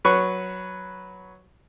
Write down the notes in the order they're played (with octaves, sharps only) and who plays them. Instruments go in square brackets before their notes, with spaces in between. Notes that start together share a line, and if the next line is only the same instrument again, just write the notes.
[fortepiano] F#3 B4 C#6